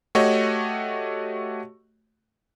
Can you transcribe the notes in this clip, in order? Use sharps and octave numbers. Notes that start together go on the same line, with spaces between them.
A3 F#4 G4 C#5 D#5